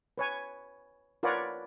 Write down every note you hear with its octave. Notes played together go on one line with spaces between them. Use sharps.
B4 C#5 G#5
F4 A#4 B4 C#5 D5 F#5